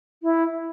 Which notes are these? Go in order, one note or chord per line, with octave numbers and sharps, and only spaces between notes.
E4